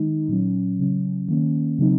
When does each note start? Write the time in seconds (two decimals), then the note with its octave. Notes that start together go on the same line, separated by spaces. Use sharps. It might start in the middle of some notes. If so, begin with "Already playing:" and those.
Already playing: D#3 G#3 D#4
0.29 A#2 F#3 C#4
0.79 C#3 F#3 C#4
1.29 D#3 A#3 C#4
1.79 C#3 F#3 C4 D#4